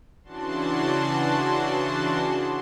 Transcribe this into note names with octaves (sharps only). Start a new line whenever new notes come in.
C#3 E3 D4 F#4 A5 C6